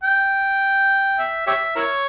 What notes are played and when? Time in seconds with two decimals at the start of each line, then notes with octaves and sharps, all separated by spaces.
0.03 G5
1.19 E5
1.47 G4 C#5 E5
1.76 E4 A#4 C#5